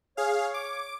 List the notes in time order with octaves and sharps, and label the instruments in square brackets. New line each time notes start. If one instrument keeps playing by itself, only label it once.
[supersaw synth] G#4 F5 [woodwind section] C#5
[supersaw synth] D6